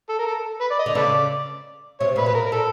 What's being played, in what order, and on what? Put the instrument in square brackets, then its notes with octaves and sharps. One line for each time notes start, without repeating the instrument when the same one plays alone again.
[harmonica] A4
A#4
A4
B4
D5
D#5
[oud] D3
[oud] C#3 [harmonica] A4 B4 D5
[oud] C3 [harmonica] C#5
[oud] A#2 [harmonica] B4
[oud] B2 [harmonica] B4
[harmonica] A#4
A#4
[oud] A#2 [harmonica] A4